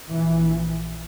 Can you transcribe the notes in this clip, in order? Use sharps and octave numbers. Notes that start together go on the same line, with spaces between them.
A#1 E3